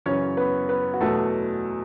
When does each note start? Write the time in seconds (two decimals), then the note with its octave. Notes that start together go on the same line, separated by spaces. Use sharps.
0.06 F#2 C#3 E3 C#4 C#5
0.37 B3 B4
0.69 B3 B4
0.94 F#4
1.01 E2 B2 F#3 A3 A4